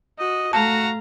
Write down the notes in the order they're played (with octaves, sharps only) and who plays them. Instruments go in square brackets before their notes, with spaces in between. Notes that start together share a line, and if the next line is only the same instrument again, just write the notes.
[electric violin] F#4 [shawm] D#5
[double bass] A3 [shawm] F#4 [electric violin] F5 A#5 [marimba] A5